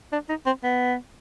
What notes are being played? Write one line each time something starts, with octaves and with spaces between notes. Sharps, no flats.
D4
D#4
C4
B3